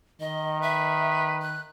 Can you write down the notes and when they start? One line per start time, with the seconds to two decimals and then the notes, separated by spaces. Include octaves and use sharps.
0.20 D#3 D#5
0.62 B4 E5
1.42 F#6